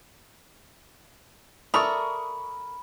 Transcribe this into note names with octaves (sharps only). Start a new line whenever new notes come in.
A4 A#4 D5 E5 B5 C#6 D#6